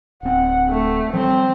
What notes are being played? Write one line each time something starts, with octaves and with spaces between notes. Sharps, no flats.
D1 C4 F#5
A3
F3 G3 C4